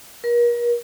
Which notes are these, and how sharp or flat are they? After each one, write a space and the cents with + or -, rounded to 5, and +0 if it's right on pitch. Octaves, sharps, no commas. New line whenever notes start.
A#4 +40